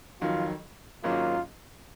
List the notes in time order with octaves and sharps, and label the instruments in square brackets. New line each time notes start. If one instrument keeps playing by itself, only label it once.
[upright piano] F2 D#3 F#3 [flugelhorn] F4
[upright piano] G#1 G#2 F#3 A#3 C#4 [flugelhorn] F4